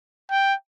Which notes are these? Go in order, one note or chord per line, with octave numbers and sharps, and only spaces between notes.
G5